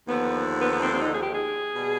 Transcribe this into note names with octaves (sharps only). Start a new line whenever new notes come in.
D#2 D3 F3 B3
B3
B3
C4
C4
D#4
G#4
G4
G#4
B2 G3